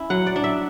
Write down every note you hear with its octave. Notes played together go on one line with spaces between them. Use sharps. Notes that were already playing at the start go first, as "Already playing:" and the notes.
Already playing: C#4 E4
F#3 F#5
D5
D4
E5